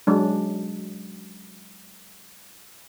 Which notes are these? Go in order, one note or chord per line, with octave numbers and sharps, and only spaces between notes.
F#3 G#3 D4